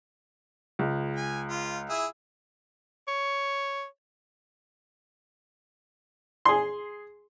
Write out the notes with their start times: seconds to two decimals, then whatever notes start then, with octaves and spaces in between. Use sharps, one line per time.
0.79 C#2
1.16 G#5
1.50 F4
1.90 E4 G#4 E5
3.07 C#5
6.45 G#4 C6